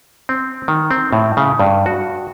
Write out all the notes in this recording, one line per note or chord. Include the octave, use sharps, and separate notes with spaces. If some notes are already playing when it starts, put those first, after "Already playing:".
C4
D#3
C4
A2
C#3
G2
F#4